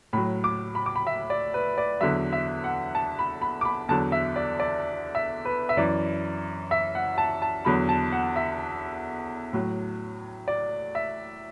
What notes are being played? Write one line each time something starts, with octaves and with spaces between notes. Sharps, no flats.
A2 F#3 B5
D6
B5
D6
B5
E5
D5
B4
D5
E2 D3 F#3 E5
E5
F#5
A5
B5
B5
D6
B5
E2 D3 F#3 A5
E5
D5
D5
E5
B4
E5
F#2 E3 D5
E5
F#5
A5
A5
E2 D3 F#3 B5
A5
F#5
E5
A2 F#3
D5
E5